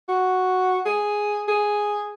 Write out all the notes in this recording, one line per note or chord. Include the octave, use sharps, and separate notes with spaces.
F#4
G#4
G#4